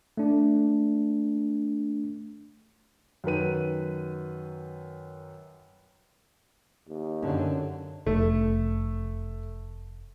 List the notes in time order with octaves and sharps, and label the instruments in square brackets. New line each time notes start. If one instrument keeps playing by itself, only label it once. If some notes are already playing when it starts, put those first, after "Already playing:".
[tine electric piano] A3 D4
[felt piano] F#2 D#3 B4 D#7
[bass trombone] D#2
[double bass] F#2 D3 [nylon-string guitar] C#4
[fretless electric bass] F1 [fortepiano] A3